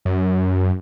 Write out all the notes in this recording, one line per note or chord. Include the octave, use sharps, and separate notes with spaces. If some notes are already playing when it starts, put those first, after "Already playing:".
F#2